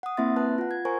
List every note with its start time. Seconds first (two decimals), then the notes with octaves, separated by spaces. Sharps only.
0.03 F#5 D#6
0.17 A#3 C4 E4 E5 C6 A6
0.36 B4 A5 F#6
0.58 F4 F#5
0.71 G#6
0.85 A#4 C5 G#5 A#5 C#6